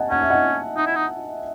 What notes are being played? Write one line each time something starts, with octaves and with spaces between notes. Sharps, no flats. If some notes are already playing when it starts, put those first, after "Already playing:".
Already playing: D#5 F#5 G#5 A5
C#4 F#5
E5
D#5 F#5
D#4
E4
D#4